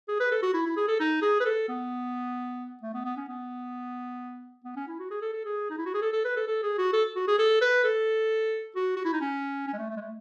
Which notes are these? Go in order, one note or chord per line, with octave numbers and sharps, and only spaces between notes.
G#4
B4
A4
F#4
E4
E4
G#4
A4
D#4
G#4
B4
A4
B3
A3
B3
B3
C#4
B3
B3
C#4
E4
F#4
G#4
A4
A4
G#4
D#4
E4
F#4
G#4
A4
A4
B4
A4
A4
G#4
F#4
A4
F#4
G#4
A4
B4
A4
F#4
F#4
E4
D#4
C#4
C#4
G#3
A3
A3
G#3
A3